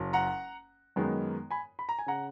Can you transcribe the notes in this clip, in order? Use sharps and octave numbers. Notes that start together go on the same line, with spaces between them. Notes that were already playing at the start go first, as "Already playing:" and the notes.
Already playing: F#1 F#3
F#5 A#5
F#2 D#3 G#3 B3 D#4
G#5 B5
B5
A#5
G#5
C#3 F#5 A#5